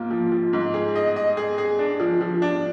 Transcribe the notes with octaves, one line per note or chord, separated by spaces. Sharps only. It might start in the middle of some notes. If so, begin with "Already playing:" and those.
Already playing: G#2 A#3 F4
F3
F3
G#2
G#4
D#5
D#5
G#4
G#4
D4
F3
F3
D4